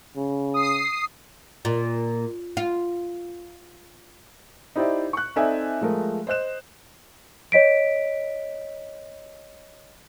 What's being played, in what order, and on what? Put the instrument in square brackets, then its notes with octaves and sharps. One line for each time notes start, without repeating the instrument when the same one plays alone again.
[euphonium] C#3
[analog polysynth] D#6 C7
[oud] A#2
F4
[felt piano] D#4 E4 G4 C5 D5 E5
C#6 F#6
C4 D#4 A4 D5 E5 G#5
F3 G#3 A3 A#4
C5 D#5 F#6 E7
[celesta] C#5 D#5 B6 D7